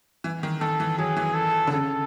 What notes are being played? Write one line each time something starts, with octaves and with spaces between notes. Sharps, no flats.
E3
D#3
D#3 A4
E3
F#3 G#4
E3
A4
D3
C#3 A4